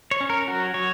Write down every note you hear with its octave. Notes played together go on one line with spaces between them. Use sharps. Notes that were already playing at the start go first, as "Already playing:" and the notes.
C#5
C#4
A#4
F#3 F#4
F#3 C#5